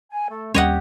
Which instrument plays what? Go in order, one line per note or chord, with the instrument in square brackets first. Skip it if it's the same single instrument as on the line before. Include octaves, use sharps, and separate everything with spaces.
[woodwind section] G#5
A3 A4
[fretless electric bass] D#2 G3 C#4 [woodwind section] C4 G4 [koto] C#5 D#5 F#5